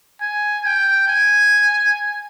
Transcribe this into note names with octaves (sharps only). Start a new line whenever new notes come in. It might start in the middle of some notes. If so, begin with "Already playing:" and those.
G#5
G5
G#5